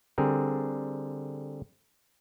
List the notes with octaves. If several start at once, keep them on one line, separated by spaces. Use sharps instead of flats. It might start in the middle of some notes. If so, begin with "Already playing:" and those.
D3 G3 C4 G#4 A#4